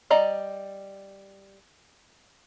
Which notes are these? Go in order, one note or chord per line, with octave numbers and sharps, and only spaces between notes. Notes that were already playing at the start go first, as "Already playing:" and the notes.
G3 D5 D#5 A#5